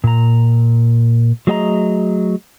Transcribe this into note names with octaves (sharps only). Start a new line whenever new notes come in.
A#2 A#5
F#3 A3 G#4 D#5 G5 A#5